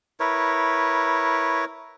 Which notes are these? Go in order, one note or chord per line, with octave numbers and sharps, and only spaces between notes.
E4 A#4 B4 C#5